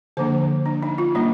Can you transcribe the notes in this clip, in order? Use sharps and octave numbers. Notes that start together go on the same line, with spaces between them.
D3 F3 A#3 D4 C5
D4
D#4
F4
G3 A#3 D4 D#4